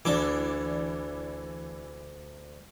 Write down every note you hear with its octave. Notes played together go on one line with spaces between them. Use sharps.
D2 E3 D4 D5 D6